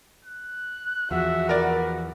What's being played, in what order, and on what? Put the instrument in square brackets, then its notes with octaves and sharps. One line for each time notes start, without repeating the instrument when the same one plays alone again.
[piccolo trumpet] F#6
[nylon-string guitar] E2 F3 [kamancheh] F#4 [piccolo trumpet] E5
[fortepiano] A#4 D5 [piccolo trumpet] B4